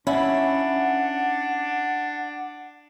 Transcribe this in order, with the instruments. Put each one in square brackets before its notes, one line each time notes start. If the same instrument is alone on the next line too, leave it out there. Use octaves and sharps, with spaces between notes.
[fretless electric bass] C#4 [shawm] D4 [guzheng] E4 [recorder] F#5